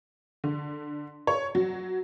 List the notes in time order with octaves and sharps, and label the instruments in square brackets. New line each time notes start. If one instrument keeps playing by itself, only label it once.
[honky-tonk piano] D3
C#5
F#3